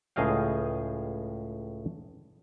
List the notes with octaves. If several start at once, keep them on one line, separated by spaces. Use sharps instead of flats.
C#2 A2 G#4 D#5 F5 G5